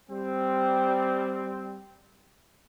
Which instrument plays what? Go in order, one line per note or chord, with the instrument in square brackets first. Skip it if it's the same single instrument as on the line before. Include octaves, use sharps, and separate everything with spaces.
[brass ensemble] G3 C4